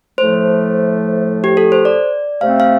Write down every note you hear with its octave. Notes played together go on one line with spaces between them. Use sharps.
A2 F3 A3 C5
G4
A4
C5
D5
C3 A3 C4 F5
F5